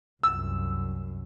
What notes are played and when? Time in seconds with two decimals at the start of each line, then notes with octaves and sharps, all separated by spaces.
0.23 C2 F#2 E6